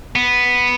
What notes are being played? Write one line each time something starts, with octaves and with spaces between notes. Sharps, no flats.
B3